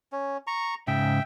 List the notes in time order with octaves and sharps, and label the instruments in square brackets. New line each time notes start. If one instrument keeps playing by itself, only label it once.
[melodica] C#4
A#5 C#6
[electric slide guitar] G#2 C#3 [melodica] E5 G5